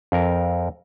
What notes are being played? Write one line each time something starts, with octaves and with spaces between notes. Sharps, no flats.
F2 A#4